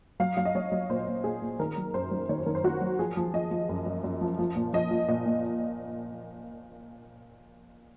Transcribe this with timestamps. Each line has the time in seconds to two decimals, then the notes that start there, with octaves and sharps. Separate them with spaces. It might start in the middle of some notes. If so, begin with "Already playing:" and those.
0.20 F#3 F5
0.37 F#3 F5
0.45 D#5
0.55 F#3 C#5
0.72 F#3
0.90 A#2 C5
1.07 A#2
1.24 A#2 G#4
1.42 A#2
1.59 D#3 A#4
1.77 F#3
1.94 F#2 C5
2.11 F#3
2.29 D#3 C#5
2.38 C5
2.46 D#3 A#4
2.55 C5
2.64 D#3 F#4
2.81 F#3
2.99 F3 G#4
3.17 F3
3.34 F3 D#5
3.51 F3
3.69 F#2
3.86 F#2
4.04 F#2
4.21 F3
4.39 F3
4.56 A#2
4.73 F3 D#5
4.91 F3
5.08 A#2 D#5
5.26 A#2